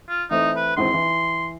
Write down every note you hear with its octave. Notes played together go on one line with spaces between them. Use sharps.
F4
E3 A3 C4 D#4
B4
G#1 E2 C4 C6
E3